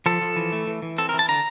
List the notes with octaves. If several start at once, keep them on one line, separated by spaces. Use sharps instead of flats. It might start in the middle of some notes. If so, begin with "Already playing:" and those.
F3 A4
F3
E3
A3
E3
E3
C4 A4
A#4
E3
A5
D3 A#5